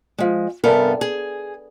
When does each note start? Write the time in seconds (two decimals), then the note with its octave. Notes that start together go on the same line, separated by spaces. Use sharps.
0.18 F3 G#3
0.64 G2 C3 B3 A4 A#4 G#5
1.01 G#4